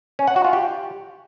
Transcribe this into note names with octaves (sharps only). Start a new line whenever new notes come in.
C#4
F#5
F#4
F4
G4